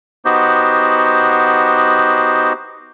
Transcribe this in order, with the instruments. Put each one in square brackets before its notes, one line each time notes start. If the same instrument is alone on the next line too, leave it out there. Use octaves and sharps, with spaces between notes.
[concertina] B3 D#4 F#4 G4 C5